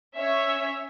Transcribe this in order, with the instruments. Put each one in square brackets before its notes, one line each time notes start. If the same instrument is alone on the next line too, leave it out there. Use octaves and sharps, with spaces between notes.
[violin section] C#4 C#5 E5